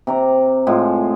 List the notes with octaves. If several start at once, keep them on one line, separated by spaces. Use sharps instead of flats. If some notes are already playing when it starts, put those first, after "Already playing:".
C3 A#5 D6
A2 G#3 F4